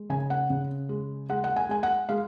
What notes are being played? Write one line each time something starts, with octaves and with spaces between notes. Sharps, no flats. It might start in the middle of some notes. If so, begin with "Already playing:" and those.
Already playing: G#3
C#3 G#5
F#5
C#3
G#3
G#3 F#5
F#5
G#5
G#3 G#5
F#5
G#3 F5